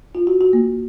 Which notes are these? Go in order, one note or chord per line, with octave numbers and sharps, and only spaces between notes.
F4
F#4
F#4
A#3